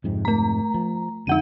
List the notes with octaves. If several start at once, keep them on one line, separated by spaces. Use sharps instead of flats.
F2 G#2 C3
A3 A#5
F3
F2 D3 G#3 D#4 F#5 D#7